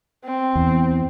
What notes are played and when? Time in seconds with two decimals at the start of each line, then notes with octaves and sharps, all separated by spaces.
0.24 C4
0.56 E2